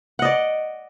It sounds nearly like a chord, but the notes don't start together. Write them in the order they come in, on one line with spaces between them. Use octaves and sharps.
F#5 D#5 D5